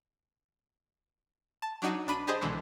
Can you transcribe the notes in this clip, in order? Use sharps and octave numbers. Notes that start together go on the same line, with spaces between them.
A5
F#3 D4 D#4 F#4 C#7 D#7
B1 D4 B5 D#7
D4 G4 G#4 C5 D#5
C2 B2 D3 E3 G#3